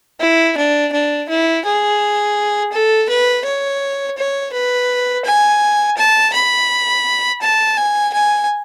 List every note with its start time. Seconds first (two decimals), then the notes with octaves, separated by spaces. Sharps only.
0.20 E4
0.57 D4
0.92 D4
1.29 E4
1.65 G#4
2.72 A4
3.09 B4
3.44 C#5
4.17 C#5
4.53 B4
5.25 G#5
5.97 A5
6.34 B5
7.41 A5
7.77 G#5
8.13 G#5